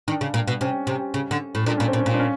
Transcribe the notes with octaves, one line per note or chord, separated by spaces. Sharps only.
D#3 D4
C#3
A#2
B2
C3 C#4
C3
C#3
D3
A2
A#2 D4
A#2 C#4
C4
A#2
C#4
A#2
D4
C#4